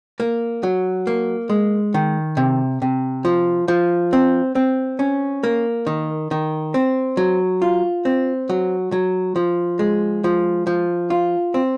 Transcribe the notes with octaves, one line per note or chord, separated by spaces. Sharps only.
A#3
F#3
A#3
G#3
D#3
C3
C3
F3
F3
C4
C4
C#4
A#3
D#3
D#3
C4
F#3
F4
C4
F#3
F#3
F3
G#3
F3
F3
F4
C4